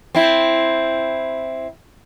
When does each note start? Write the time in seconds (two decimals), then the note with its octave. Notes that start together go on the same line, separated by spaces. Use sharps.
0.15 C4 E4